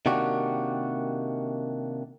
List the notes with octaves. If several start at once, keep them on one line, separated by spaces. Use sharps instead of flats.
C3 D#3 A#3 D4 F#4 G4